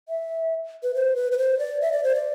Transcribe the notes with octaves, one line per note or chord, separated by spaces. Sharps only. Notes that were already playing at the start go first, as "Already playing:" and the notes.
E5
B4
C5
B4
B4
C5
D5
E5
D5
C5
D5